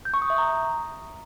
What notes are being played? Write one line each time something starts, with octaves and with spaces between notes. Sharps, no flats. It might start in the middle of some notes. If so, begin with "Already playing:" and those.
G6
C#6
D#6
E5
A#5